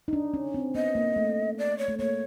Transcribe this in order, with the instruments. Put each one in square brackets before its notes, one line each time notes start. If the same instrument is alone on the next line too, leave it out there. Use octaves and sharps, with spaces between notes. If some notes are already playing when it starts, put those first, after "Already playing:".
[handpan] D#4
D4
C#4
C4
[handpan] B3 [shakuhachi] D#5
[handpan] A#3
A3
[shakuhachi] D5
C#5
[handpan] A3
[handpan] A#3 [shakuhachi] C#5